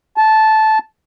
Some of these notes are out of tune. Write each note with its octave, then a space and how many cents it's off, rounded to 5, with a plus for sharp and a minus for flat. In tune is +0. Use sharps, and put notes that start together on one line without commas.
A5 -10